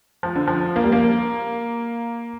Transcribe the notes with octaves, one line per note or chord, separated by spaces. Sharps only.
F3
D3
F3
A#3
G3
A#3